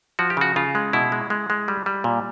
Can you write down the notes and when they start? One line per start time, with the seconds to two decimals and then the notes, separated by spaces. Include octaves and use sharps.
0.19 F3 F#4
0.30 G4
0.37 C#3 F#4
0.56 C#3 F4
0.75 G#3
0.93 B2 E4
1.12 G#3
1.30 G#3
1.50 G#3
1.68 G3
1.86 G3
2.04 A#2